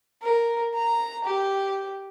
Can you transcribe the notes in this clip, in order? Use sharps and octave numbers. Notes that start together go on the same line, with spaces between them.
A#4
A#5
G4